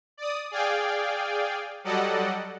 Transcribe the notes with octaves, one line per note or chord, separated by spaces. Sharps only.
D5 D#6
G#4 D5 F5 G5 G#5
F#3 G3 A4 D5 D#5 F#5